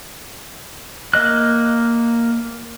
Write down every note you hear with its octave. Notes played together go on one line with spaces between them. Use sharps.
A#3 D#5 F#6